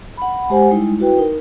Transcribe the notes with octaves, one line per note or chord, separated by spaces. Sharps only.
F#5 B5
G#3 G4 C5 F#5 G#5
G3 G#3 D#4 E4
E4 F#4 B4 G5
D#4 A#4